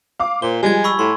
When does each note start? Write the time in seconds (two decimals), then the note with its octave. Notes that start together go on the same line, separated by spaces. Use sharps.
0.20 F5 D6
0.42 A#2 C5 G7
0.63 F3 G3 G#3 G#5 G#6
0.84 B5 C#6 E6
0.99 A2 C6